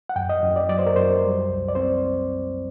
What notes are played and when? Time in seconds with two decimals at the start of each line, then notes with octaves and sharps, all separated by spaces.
0.09 F#5
0.16 F#2 G5
0.29 D#5
0.43 F#2
0.56 D5
0.69 F#3 D5
0.79 C5
0.86 A#4
0.96 F#2 C5
1.23 G3
1.50 C2
1.69 D5
1.75 C4 C5